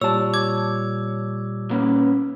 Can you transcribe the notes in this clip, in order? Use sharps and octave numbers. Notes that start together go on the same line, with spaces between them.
A#2 G3 C#5 A5 E6
D6 G#6
A#3 C#4 B4